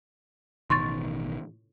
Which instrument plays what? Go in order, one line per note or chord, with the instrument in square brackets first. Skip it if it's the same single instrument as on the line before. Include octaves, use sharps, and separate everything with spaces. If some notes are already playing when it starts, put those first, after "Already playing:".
[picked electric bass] A1 B2 D#3 [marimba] C6 C#6 A6